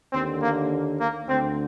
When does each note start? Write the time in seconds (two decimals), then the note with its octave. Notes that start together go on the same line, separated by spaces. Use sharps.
0.13 D#2 D3 C4
0.42 A#3
1.00 A#3
1.28 D2 D3 C4